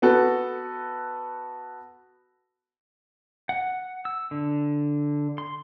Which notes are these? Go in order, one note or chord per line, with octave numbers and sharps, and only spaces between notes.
B3 F#4 A4 B4
F#5
E6
D3
C6